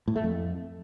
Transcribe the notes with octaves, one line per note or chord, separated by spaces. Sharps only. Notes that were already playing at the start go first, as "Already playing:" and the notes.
A2
A3
F2